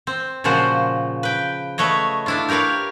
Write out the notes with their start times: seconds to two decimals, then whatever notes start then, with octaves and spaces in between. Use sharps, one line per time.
0.07 C4
0.44 A#2 C#3 F3 F#4 C5
1.23 B4 G5
1.78 A3 B4 C#5 D#5
2.26 D4 E4 F4
2.49 G4 A#4 B4 C#5 F5